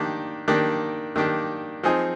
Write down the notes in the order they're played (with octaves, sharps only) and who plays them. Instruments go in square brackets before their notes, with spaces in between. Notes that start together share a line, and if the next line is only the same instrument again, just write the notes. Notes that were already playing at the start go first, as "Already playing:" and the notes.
Already playing: [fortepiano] D#3 A#3 D4 G4
D#3 A#3 D4 G4
D#3 A#3 D4 G4
F3 C4 D#4 G#4